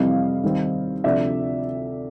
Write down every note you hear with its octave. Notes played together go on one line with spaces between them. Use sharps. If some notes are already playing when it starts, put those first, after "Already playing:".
Already playing: F2 C3 E3 G3 C4 D#5 F5
D#2 D#3 G3 C4
D2 C3 F3 D5 E5